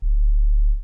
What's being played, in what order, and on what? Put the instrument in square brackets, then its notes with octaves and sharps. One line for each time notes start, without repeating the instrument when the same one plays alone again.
[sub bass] D1